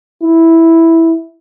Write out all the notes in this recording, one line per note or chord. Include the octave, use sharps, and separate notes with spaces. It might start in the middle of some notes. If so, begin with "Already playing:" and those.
E4